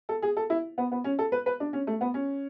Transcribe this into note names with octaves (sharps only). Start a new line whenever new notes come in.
A4
G#4
A4
E4
B3
B3
C#4
A4
B4
B4
D4
C#4
A3
B3
C#4